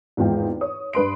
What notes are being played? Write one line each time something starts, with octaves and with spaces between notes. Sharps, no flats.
G#1 E2 G#3 F4 G5
C#5 D#6
G2 B4 C6 D7